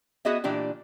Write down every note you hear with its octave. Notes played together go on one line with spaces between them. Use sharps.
B3 F#4 G#4 D#5 E5
A#2 E3 D4 G4